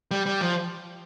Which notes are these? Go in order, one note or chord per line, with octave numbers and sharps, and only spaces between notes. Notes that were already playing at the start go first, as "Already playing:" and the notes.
G3
G3
F3